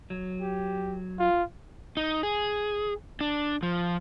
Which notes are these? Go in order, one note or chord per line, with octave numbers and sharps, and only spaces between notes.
F#3
G4
F4
D#4
G#4
D4
F3